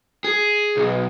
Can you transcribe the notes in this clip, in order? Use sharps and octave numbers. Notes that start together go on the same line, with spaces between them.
G#4
B1